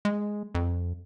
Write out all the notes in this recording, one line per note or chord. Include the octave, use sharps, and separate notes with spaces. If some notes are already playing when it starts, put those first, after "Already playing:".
G#3
F2